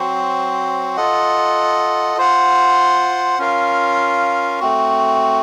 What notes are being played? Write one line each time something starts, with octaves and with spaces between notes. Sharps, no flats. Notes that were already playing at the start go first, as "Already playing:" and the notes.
Already playing: F#3 C4 F#4 C5
F4 A4 D#5 F#5
F4 C5 F#5
C#4 F4 A#4 F5
A3 C4 F#4